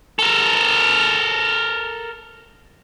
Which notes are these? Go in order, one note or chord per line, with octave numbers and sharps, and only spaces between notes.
A4 A#4